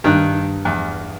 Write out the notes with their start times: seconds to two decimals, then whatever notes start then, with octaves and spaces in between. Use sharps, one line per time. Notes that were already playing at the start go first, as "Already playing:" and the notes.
0.04 G2 D#3 F#6
0.65 E2